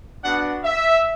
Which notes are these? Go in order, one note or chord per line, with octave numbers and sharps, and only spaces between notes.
B3 D4 F#4 F#5
E5